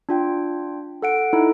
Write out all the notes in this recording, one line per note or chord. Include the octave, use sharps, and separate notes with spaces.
D4 F4 G5
A4 F#5 D7
D#4 E4 A4